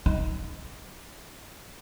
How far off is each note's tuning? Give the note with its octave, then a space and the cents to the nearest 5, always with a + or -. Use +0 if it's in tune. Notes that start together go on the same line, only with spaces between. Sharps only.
D#4 +15